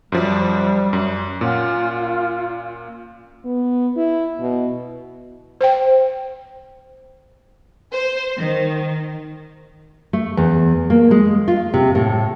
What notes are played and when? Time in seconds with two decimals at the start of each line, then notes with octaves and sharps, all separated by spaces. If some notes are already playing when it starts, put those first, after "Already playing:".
0.12 F#2 F3 G3
0.93 F#2
1.41 A#2 C#4 F4 F#5
3.45 B3
3.96 E4
4.40 B2
5.61 C5 G5
7.92 C5
8.37 D#3
10.13 A3
10.37 E2
10.90 A#3
11.11 G#3
11.48 F4
11.74 C3
11.95 A2